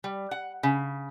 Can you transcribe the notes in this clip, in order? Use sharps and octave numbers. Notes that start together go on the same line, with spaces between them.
G3
F#5
C#3